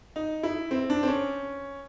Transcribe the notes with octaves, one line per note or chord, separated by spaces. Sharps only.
D#4
E4
C4
D4
C4
C#4